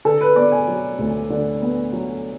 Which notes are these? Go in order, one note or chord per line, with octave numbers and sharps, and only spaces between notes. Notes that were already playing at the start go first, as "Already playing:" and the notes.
D3 A4
B4
B3 D5
G#5
F#3
D2
D3
B3
F#3